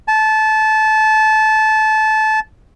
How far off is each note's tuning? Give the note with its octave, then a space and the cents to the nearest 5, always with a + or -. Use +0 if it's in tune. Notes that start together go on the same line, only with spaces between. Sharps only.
A5 -20